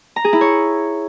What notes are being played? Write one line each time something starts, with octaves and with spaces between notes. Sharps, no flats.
A#5
G#4
E4
C#5